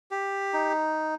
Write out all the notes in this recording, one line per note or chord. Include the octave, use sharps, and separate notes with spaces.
G4
D#4